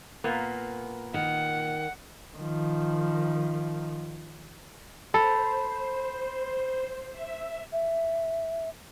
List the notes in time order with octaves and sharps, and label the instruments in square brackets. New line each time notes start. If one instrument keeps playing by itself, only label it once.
[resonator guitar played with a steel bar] A#2 A#3 B3
[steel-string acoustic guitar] D#3 [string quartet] F#5
[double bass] D#3 F3
[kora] A4 [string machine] C5 [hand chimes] B5
[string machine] E5
[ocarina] E5